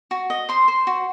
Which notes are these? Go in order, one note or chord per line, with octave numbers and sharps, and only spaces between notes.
F#4
D#5
C5 C6
C5
F#4